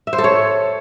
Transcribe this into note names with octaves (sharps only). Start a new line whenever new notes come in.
E5
C5
A4
C#5